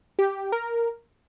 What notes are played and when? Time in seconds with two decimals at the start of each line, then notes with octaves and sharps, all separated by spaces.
0.19 G4
0.52 A#4